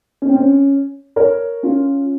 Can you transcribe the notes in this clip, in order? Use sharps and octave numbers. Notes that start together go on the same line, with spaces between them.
C#4
C4
C#4
A#4 C#5
C#4 F4